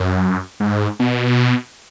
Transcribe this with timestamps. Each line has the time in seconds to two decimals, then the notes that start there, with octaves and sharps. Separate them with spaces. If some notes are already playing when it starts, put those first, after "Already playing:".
Already playing: F#2
0.60 G#2
1.00 B2